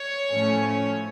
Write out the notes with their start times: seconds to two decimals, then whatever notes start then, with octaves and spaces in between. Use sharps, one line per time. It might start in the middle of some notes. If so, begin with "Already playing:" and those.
Already playing: C#5
0.31 A2 F3 A3 C#4